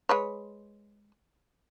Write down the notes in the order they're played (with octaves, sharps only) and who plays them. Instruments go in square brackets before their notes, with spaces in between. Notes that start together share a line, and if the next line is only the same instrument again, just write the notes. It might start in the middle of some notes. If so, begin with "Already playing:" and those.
[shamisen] G#3 B4 C#5